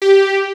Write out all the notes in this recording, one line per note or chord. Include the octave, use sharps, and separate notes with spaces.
G4